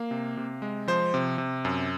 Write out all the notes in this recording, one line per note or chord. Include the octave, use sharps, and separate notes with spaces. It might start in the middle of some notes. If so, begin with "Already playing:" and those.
Already playing: A#3 F5
C3
C3
G#3
F3 C5
C3
C3
F#2